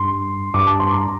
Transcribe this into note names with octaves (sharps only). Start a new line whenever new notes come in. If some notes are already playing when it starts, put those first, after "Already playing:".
Already playing: G2 C6
G2 D6
A5
C6
A#5